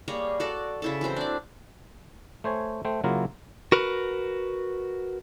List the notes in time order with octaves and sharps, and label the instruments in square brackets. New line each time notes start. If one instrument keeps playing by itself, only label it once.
[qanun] G3 A#3 G#4 C#5
F#4 A4 D5
C#3 E4 A4
E3 F#3 C4 C5
D4 D5
[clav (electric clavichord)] A3 C5 C#5 G#5
A3 C5 G5
C#3 F#3 A#3 E4 F4 A#4
[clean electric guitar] F#4 A#4 B4